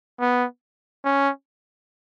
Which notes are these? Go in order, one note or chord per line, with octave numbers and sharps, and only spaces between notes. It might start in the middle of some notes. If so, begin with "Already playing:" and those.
B3
C#4